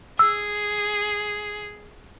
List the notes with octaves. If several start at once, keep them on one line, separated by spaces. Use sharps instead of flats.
G#4 E6